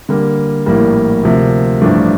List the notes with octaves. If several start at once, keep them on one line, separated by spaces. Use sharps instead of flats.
D3 G3 A#3
A#1 A2 G3 A#3
D2 C3 F3 A#3
A1 G2 F3 A3 D4